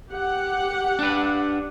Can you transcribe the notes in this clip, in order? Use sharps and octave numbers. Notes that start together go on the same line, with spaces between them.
G4 F#5
D4 B4